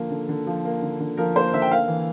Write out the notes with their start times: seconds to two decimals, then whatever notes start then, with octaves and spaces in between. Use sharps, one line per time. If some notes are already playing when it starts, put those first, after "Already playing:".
Already playing: D3 F3 A#3
0.11 D3
0.29 D3
0.47 F3
0.65 A#3
0.82 D3
1.00 D3
1.17 F3 A#4
1.36 A#3 C5
1.54 D3 E5
1.62 G5
1.71 A#3 F5
1.88 E3